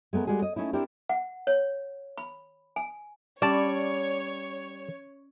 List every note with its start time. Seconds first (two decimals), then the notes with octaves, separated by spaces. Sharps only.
0.13 G#3 A3 B3 A#4
0.27 G3 G#3 F#4 G#4
0.42 D#5
0.56 A3 C#4 D#4 E4
0.73 C4 D4 E4 G4 A#4
1.09 F#5
1.47 C#5
2.18 B5
2.76 G#5
3.42 G3 C#4 C#5 D5 A5 B5